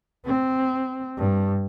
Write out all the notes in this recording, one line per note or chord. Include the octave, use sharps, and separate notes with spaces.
C4
G2